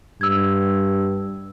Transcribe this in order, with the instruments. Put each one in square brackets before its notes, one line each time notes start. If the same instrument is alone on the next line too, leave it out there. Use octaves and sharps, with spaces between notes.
[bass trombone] G2 [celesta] E6 G#6